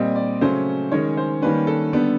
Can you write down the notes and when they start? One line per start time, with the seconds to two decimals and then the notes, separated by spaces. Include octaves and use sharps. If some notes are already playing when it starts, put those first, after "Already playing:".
Already playing: A#2 G3 C4 D#5
0.16 D5
0.41 C#3 F#3 A3 C#4 C5
0.91 D#3 G#3 C#4 C#5
1.17 C5
1.42 D#3 G3 A#3 C#4 B4
1.67 A4
1.92 D3 G3 B3